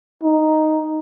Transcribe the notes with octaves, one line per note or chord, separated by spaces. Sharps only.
D#4